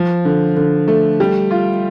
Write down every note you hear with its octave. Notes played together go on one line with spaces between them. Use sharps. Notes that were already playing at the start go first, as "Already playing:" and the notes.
Already playing: F3
D3
D3
A3
G3
F4